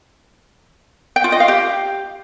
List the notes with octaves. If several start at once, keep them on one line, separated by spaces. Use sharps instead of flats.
G5
F4
D#5
F5
G4